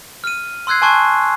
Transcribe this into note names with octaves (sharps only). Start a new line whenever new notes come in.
F6 D#7
C6 E6 F#6 G#6 C7
G#5 A5 C6 C#6 F#6 G#6